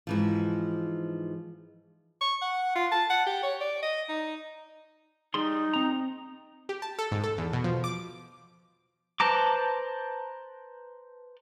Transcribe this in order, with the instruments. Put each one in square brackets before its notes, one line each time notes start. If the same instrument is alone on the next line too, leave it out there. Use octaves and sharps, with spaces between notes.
[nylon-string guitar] G#2 E3 F3
[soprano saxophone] C#6
F#5
F4
A5
F#5
G4
C#5
D5
D#5
D#4
[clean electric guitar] G3 G#4 C6 [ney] D#4
[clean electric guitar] C4 A#5
[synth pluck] G4
A5
A4
G#2
A4
E2
B2
F3
D6
[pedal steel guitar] B4 C5 A5 A#5 D6